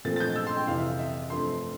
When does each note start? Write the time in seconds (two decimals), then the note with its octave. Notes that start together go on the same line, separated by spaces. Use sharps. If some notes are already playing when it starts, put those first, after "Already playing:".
0.05 A#2 F3 A3 C4 A6
0.16 A6
0.20 G6
0.36 E6
0.47 C6
0.57 G5
0.67 F2 C3 E3 F5
0.78 E5
0.99 E5
1.30 G2 F3 A3 C4 C6